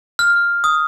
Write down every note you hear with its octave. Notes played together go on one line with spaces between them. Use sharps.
F6
D#6